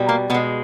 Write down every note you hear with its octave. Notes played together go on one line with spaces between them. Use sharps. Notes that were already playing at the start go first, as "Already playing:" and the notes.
Already playing: B2 G3
A#3
B2 G#3 B3